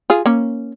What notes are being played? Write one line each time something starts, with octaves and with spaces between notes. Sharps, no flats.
F4 G#4
A#3 C#4